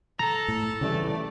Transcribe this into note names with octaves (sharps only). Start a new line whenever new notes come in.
A4 A#5
A2
C#3 E3 G3 A3 D5